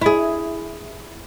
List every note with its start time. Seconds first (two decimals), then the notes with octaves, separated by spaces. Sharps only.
0.01 E4 G#4